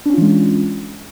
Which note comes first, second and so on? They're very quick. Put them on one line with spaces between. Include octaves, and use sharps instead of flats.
D4 C#4 F4 E3 G#3